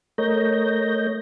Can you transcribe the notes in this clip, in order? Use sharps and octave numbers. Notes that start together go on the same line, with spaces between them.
A3 A#4 C#5 D#5 G6 A#6